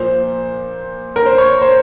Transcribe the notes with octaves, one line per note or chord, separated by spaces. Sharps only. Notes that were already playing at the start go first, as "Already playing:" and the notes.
Already playing: A#2 F3 C5
A#4
C5
C#5
C5